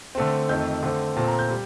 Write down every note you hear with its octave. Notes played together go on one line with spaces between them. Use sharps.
D3 A3 C4
F2 D#3 A3 G6
D3 A3 C4
A#2 A3 C4 A5
A#5
G6
G3